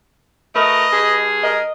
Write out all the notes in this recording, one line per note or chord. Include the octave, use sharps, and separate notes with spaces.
A3 F#4 A#4 B4 D#5
G2 G#4
A#4 D#5